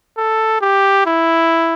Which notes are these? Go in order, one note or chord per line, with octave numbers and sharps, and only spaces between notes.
A4
G4
E4